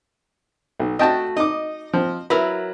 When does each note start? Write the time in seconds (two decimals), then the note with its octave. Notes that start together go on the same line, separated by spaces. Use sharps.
0.80 B1
0.99 A3 F#4 D#5 G5 A5
1.36 D#4 D#5 D6
1.93 F3 C4
2.30 F#3 E4 A#4 B4